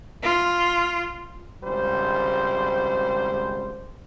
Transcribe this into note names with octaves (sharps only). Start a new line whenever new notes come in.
F4
G#1 C#2 G3 C5